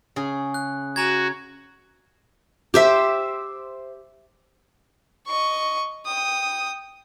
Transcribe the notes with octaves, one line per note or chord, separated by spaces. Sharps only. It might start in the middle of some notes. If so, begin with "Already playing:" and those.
C#3 G#4
F#6
F#4 G#5 A#5 G#6
G4 C5 E5
D#5 C#6
G5 D#6